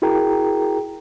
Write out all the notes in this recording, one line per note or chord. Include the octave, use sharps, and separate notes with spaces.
E4 F#4 G#4 A#4 G5 A#5